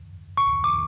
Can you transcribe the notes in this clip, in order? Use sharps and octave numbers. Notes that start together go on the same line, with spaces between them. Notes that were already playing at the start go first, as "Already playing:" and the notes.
C#6
D6